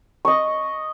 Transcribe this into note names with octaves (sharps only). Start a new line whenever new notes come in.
D#5 C#6